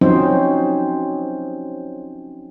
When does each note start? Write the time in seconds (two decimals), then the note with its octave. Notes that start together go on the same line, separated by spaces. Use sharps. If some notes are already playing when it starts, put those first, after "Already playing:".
0.01 F3 F#3 C4 C#4 D#4 C5